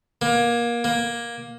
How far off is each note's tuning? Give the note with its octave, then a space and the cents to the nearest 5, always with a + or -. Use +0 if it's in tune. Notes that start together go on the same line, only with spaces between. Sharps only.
A#3 +25
A#3 +15